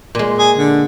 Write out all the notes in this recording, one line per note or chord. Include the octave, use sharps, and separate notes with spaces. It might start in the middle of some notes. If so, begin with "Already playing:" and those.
A#2 G#3
G#4
D3